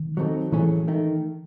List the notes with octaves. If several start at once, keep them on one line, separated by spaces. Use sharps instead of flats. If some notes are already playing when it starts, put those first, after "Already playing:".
Already playing: D#3
F#3 C4 D#4 A4
A2 E3 F#3 A3 C#4 G#4
D#3 A3 D#4